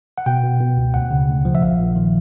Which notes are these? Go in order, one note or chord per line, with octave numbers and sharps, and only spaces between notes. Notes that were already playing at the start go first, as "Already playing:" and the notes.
F#5
B2 G5
B2
B2
C#2
D2 F#5
C#3
D2
F3
E5
A#1 F5
A#1
D#3